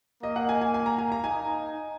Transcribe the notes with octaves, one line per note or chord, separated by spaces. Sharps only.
A#3 D#5
F#5
G#5
G#5
G#5
A#5
G#5
A#5
D#4 G#5